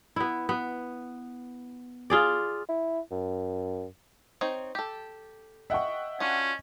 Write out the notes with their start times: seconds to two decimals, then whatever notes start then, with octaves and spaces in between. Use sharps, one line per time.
0.16 B3 E4
0.49 B3
2.10 F4 G#4 D5
2.69 E4
3.11 F#2
4.41 C4 D#4 C#5
4.75 G4 A4
5.70 D#5 E5 F#5 G5 C#6
6.20 C#4 D4 F4 F#4